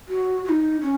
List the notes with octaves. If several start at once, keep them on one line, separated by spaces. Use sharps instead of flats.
F#4
F#4
D#4
C#4